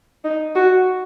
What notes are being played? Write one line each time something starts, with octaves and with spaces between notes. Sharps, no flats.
D#4
F#4